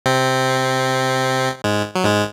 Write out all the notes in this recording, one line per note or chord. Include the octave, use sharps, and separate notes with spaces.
C3 C4
G#2 G#3
F#3
G#2 G#3